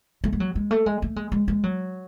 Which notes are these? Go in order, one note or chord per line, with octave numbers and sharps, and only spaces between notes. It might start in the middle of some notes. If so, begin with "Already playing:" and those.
A3
G#3
F#3
G#3
A3
G#3
A3
G#3
G#3
G#3
F#3